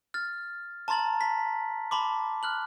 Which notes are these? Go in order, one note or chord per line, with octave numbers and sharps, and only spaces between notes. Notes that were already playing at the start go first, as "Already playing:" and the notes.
F6 A6
A5 A#5 C6 A6 F#7
A5 B6
A5 B5 C6 D6
F6 F#6 F#7